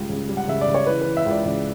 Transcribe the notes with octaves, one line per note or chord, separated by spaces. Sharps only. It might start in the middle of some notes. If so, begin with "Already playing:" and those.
Already playing: C#2 G3
C#3
G3
F#5
C#3 E5
D5
C#3
C#5
E3 B4
E3 B4
E5
C#2
D5
C#3 D5